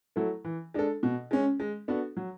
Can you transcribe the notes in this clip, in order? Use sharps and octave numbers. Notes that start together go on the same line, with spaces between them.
F#3 A3 E4 A4
E3
G#3 D4 A4
B2
G#3 C#4
G#3
B3 D4 F#4 A4
F#3